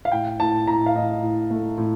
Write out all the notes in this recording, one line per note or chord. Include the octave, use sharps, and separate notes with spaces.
F5
A2 G5
A2 A5
A2 A#5
F5
A2 D#5
A2
A3
A2